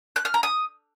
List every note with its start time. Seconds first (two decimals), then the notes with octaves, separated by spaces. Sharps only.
0.16 F#6
0.25 F6
0.34 A#5
0.43 D#6